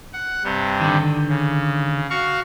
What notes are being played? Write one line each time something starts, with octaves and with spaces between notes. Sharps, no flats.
F#5
G2 C3 G3
D3 D#3
C#3
F#4 F5 C#6